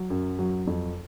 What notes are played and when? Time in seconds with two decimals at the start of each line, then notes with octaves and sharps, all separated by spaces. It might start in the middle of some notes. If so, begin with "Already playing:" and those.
Already playing: F#3
0.10 F#2
0.39 F#3
0.67 F2